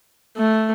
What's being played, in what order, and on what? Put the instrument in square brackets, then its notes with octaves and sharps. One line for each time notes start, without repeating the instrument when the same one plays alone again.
[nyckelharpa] A3